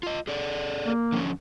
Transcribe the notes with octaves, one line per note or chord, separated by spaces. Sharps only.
F4 D#5
G#4 A4 D5
A#3
D3 F3 C#4